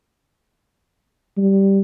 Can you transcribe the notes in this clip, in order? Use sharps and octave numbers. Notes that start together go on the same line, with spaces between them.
G3